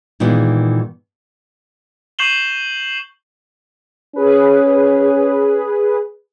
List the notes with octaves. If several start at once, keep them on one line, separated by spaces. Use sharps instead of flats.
A#2 D#3 E3 G#3 B3
C#6 G6 C7 E7 F#7 G7
C#4 G#4 B4